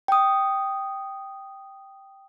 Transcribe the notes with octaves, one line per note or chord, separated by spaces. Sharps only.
G5 D#6